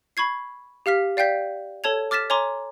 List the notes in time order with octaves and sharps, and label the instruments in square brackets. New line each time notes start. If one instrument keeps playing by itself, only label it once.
[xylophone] B5 C#6 G#6 C7
G4 F5 F6 B6
D5 F5 G5 G6 B6
A4 C#5 A5 G#6 F7
D6 F6 A6 B6 E7
C#5 G#5 A#5 C6 D6